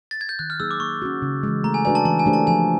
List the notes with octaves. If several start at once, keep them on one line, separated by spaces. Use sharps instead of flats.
A6
G#6
G6
D#3 F#6
F6
F#3 A#3 D#4 G#4 E6
D6
A#3 C#6
C#4 F#4
C#3
E3 G#3
A3 A#5
G#5
D4 F#4 B4 D5 G#5
A5
E3 A5
G#5
A3 D4 G4 C5
A5
F3 G#5